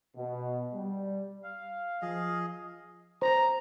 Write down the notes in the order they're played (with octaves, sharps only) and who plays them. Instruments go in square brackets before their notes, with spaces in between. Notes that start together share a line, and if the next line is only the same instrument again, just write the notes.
[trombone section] B2
G3
[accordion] F5
[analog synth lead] F3 [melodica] G#4 D#5
[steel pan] C5 [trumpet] A#5